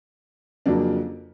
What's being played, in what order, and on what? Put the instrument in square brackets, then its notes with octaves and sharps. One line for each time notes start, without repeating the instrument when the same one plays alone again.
[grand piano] F2 C#3 F#3 A#3 D4